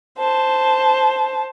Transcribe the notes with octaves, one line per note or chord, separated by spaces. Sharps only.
C5 A5